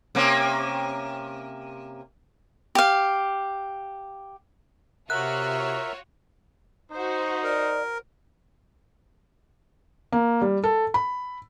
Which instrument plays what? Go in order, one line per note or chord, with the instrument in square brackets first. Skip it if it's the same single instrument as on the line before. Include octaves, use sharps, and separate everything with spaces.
[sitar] C3 A#3 C#4
[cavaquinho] G4 F5
[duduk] C3 [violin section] F4 F#4 C#5 [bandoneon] A#4 E5 [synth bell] F#6
[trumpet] D#4 [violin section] F#4 C5
[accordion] A#4 [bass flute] D5
[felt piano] A#3
G3
A4
B5